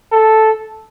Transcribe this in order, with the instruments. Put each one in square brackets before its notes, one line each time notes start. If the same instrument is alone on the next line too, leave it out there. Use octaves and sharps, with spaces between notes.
[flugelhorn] A4